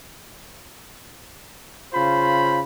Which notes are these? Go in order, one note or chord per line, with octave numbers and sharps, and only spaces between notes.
C#3 F4 C5 B5